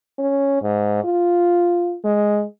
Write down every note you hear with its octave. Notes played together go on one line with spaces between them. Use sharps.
C#4
G#2
F4
G#3